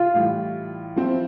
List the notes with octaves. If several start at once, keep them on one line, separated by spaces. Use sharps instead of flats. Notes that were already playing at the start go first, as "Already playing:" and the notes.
Already playing: F4
A2 E3 G3
F3 C4 E4